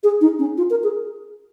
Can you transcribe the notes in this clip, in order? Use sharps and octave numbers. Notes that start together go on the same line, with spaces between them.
G#4
D#4
C#4
F4
A#4
G#4